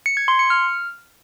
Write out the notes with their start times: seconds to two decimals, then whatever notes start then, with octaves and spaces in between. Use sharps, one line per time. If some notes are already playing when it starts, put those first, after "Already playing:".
0.06 C#7
0.17 G#6
0.28 C6
0.39 C#7
0.50 F6